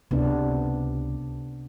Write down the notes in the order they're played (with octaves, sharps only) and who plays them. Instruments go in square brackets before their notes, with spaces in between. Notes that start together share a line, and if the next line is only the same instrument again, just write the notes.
[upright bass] C#2 [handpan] C3 B3 D4